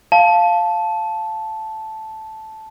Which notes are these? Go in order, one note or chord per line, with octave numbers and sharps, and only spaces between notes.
F5 A5